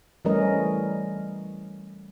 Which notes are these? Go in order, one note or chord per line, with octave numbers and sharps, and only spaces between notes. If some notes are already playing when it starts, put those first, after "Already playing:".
E3 G3 A3 C#4 A#4 D#5